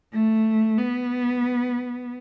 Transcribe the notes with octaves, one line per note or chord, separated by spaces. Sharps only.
A3
B3